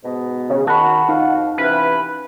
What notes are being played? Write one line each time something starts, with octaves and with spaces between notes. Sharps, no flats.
G#2 B2 B3
C#3
D#3 F#4 A5 B5
F2 D#4 F5
C3 E3 C#4 B4